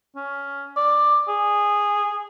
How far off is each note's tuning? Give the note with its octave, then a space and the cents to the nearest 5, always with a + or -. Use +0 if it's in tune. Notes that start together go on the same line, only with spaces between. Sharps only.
C#4 +15
D5 +10
G#4 -10